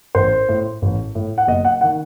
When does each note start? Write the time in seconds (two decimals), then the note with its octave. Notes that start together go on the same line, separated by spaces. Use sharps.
0.15 A1 C5
0.49 A2
0.82 A1
1.15 A2
1.38 F#5
1.47 F#1 D#5
1.65 F#5
1.81 D#3 F#5